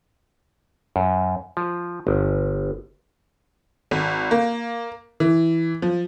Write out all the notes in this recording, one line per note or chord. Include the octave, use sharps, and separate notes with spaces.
F#2
F3
G1
G#1
A#3
E3
F3